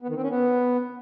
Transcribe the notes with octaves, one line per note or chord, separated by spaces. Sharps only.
B3
D#3
C4
C#4
B3